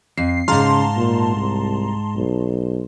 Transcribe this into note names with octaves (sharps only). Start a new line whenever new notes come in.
F2 C7
G#2 C#3 F5 A5 A#5 C6
A#2
C2
B1